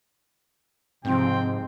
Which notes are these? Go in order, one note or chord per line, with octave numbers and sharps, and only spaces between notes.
G#2 C3 F3 C4 G5